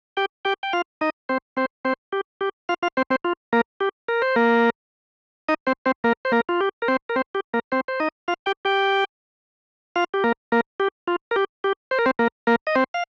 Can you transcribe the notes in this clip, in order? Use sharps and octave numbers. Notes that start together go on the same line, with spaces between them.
G4 G5
G4 G5
G5
F4 F5
D#4 D#5
C4 C5
C4 C5
C4 C5
G4
G4
F4 F5
F4 F5
C4 C5
C4 C5
F4
A#3 A#4
G4
A#4
C5
A#3 A#4
D#4 D#5
C4 C5
C4 C5
A#3 A#4
C5
A#3 A#4
F4
G4
A#4
C4 C5
A#4
C4 C5
G4
A#3 A#4
C4 C5
C5
D#4 D#5
F4 F5
G4 G5
G4 G5
F4 F5
G4
A#3 A#4
A#3 A#4
G4
F4
A#4
G4
G4
C5
A#4
C4 C5
A#3 A#4
A#3 A#4
D#5
C4 C5
F5